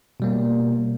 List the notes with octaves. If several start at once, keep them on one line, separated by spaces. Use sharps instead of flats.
B2 G3 A#3